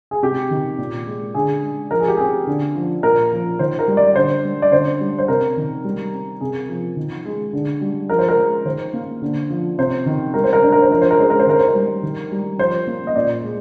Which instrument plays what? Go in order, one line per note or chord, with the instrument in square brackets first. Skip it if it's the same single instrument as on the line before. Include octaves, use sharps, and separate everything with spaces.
[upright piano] G#4
C3 G4
D#3
A#2
G#3
D3 G#4
G#3
F3 A#4
G#4
G4
C4 G#4
D3
F3
A#2 A#4
F3
D#3 C5
A#4
G3
D5
D3 C5
G3
D5
D3 C5
G3
C5
C3 A#4
D#3
G3
C4
C3 G#4
F3
D#3
G#3
D3
G3
F3 A#4
C5
A#4
G#3
D#3 C5
A#3
D3
F3
C3 C5
D#3
G3 A#4
C5
A#4
D4 C5
A#4
C5
F3 A#4
C5
A#4
G#3 C5
A#4
C5
D#3 A#4
C5
A#4
G3
D#3
G3
F3 C5
A#3
D#5
A#2 D5
G#3